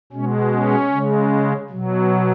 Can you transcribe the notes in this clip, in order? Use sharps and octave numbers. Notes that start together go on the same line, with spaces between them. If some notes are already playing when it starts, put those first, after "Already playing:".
B2 G#3 C#4
C#4
C#3 G#3
B2 F#3